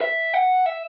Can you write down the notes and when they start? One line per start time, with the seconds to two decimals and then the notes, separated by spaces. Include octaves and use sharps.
0.01 E5
0.34 F#5
0.66 E5